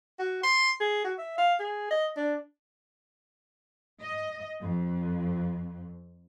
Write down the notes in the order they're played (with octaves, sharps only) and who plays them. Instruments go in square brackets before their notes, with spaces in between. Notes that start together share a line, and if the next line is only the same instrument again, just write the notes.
[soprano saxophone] F#4
C6
G#4
F#4
E5
F5
G#4
D#5
D4
[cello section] D#5
F2